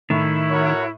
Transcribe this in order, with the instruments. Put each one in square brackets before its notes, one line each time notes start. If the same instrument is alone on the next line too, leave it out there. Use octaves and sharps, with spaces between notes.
[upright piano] A2 [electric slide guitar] D#3 [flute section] E4
[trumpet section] F#4 A#4 C#5